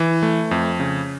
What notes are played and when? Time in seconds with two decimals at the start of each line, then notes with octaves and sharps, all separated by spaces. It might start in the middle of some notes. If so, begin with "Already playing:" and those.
Already playing: E3
0.23 A3
0.51 F2
0.80 C#3